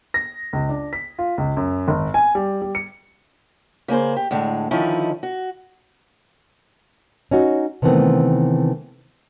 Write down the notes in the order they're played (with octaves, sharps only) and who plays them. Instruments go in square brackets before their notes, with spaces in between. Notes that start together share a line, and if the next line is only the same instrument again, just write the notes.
[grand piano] A#6
C#2
D4
B6
F4
C#2
F#2
G#1
G#5
G3
G3
C#7
[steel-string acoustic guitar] C#3 A#3 G#4 C5
G4
A2 D3 G#3
D3 D#3 F3 C#4 D#4 E4
F#4
[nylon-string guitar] C#4 D#4 F#4
C3 D#3 E3 A3 B3 C4